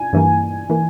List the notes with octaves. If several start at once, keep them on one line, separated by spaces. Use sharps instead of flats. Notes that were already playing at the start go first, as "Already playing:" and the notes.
Already playing: G#5
G2 E3 A#3
E3 A#3